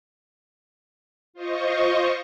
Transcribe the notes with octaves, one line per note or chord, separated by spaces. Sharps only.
F4 C5 D#5 C#6